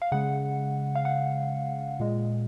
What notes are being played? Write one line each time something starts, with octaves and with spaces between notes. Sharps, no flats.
F5
C#3 G#3 F#5
F5
F#5
A#2 G#3